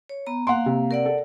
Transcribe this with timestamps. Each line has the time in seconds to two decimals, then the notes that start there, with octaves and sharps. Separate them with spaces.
0.09 C#5
0.27 B3 A#5
0.47 A#3 F5 F#5 C6
0.66 C3
0.91 A#4 D5 F#5
1.05 A4